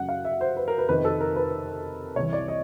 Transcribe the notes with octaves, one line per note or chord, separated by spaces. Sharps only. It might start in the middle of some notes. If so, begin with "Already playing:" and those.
Already playing: F#2 C#3 F#3 F#5
F5
E5
C5
B4
A#4
B4
F2 C3 D#3 B4
A4
A#4
B4
C2 C3 E3 C#5
D5
D#5